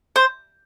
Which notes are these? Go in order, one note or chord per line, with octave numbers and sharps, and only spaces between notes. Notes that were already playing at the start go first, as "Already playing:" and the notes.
C5